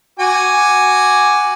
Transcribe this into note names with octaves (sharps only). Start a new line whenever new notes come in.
F#4 G#5 D6